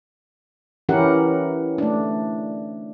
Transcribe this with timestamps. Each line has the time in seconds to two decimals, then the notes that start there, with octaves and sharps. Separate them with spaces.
0.89 E3 C#4 E4 G4 A#4 F#5
1.78 A3 D4